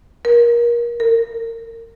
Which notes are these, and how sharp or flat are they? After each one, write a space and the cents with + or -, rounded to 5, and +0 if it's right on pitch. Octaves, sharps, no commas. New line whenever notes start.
A#4 +25
A#4 -30